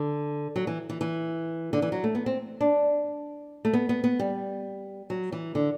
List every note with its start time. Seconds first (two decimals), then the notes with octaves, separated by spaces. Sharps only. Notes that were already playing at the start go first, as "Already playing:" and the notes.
Already playing: D3
0.56 F#3
0.67 E3
0.90 E3
1.01 E3
1.73 D3
1.82 E3
1.92 F#3
2.04 A3
2.15 B3
2.26 C4
2.61 D4
3.65 A3
3.73 B3
3.89 B3
4.04 B3
4.19 G3
5.10 F#3
5.32 E3
5.55 D3